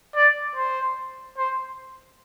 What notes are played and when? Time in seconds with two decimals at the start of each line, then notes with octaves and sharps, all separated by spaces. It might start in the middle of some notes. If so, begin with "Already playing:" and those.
0.16 D5
0.56 C5
1.38 C5